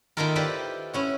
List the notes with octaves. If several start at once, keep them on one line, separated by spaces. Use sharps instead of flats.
D#3 A#3 E4 F4 A4 A#4
E4 F4 G4 B4 C5 D5
C#4 E4 F#4